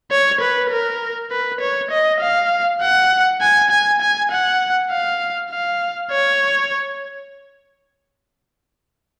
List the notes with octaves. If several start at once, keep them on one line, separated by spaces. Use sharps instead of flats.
C#5
B4
A#4
B4
C#5
D#5
F5
F#5
G#5
G#5
G#5
F#5
F5
F5
C#5